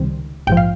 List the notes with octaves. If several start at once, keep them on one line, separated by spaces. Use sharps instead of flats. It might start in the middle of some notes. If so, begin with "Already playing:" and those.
Already playing: C#2 C3 D#3 G3 C4
A#1 G#2 F3 G5
F5